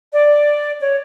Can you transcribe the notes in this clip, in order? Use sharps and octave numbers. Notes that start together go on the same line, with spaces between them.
D5
C#5